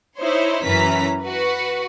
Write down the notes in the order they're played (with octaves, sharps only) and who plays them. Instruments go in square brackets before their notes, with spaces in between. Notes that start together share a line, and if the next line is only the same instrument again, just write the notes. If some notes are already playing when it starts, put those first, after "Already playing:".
[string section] D#4 E4 C5 C#5
F#2 E3 C#4 B4 A#5 B6
F#4 B4